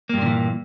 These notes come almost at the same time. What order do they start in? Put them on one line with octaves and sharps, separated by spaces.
A#3 G2 A#2 D3 E3